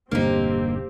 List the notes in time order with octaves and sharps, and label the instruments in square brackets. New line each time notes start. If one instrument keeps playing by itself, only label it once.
[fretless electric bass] E1 G2 D3 [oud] A#3 D#4 [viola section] C4 G4